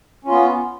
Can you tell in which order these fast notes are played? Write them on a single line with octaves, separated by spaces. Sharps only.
C#4 F4 B3